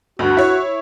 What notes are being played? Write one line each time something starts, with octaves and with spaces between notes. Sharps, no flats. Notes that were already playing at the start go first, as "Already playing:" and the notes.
D2 G2 F#4
E4 C#5